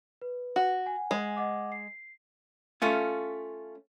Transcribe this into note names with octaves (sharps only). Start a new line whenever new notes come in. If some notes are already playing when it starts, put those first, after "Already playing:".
B4
F#4
F#5 G#5
G#3
D#5 F#5 D6
C7
A3 C#4 F4